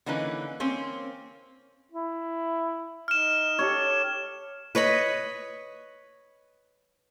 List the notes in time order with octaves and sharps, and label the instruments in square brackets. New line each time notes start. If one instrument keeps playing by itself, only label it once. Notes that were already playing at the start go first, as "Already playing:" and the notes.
[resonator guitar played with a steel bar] D3 E3 A#3 C#4 D#4 B4
A#3 C4 C#4 C5
[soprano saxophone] E4
[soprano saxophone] D#4 [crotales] F6 E7
[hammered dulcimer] G4 A4 C#5
[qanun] B4 C#5 D#5 B5